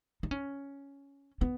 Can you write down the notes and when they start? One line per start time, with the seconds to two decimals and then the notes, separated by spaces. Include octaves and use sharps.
0.23 D#4
0.31 C#4
1.41 B3